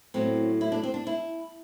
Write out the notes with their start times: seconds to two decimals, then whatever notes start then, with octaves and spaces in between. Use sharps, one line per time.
0.14 A2 F#3 C4
0.61 E4
0.72 D4
0.84 C4
0.94 D4
1.07 E4